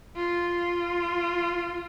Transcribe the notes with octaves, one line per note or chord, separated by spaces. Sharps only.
F4